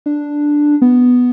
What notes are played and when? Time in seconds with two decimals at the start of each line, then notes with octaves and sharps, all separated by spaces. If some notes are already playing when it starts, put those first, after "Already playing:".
0.06 D4
0.82 B3